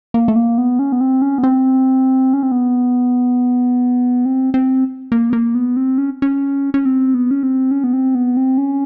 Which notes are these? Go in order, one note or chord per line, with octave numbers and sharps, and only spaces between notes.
A#3
A3
A#3
B3
C#4
B3
C4
C#4
B3
C4
C#4
C4
B3
C4
C4
A#3
B3
A#3
B3
C4
C#4
C#4
C#4
C4
B3
C#4
C4
C#4
B3
C4
B3
C4
C#4